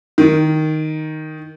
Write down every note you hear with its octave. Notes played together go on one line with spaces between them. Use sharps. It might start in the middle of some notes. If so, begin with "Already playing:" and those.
D#3